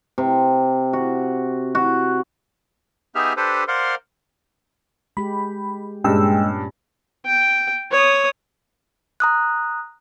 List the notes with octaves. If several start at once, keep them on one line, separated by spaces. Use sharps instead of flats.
C3
F#4
F#4
B3 D#4 G4 G#4 E5 F6
D4 G4 A4 B4 C5
A#4 C5 D5 F5 F#5 C6
G#3 G4 B5
G2 A#2 G#3 C#4 G5 E6
G5
C#5 D#6
A#5 D#6 F#6